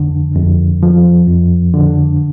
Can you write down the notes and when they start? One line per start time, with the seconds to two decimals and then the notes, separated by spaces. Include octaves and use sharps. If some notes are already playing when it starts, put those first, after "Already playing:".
Already playing: F2 D3
0.36 F2
0.83 F3
1.28 F2
1.74 D3